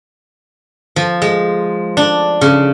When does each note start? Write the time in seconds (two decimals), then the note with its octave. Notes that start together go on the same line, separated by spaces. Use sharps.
0.96 F3
1.22 G#3
1.97 D4
2.41 C#3